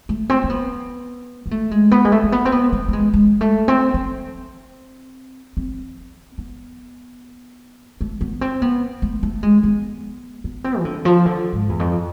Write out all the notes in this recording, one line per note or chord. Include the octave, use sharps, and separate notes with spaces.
A3
C4
C4
B3
B3
A3
G#3
B3
G#3
A3
A3
B3
C4
B3
A3
A3
G#3
G#3
A3
C4
C4
C4
B3
A3
B3
C4
B3
A3
A3
G#3
B3
B3
C4
E3
D3
F3
D3
G#2
E2
F2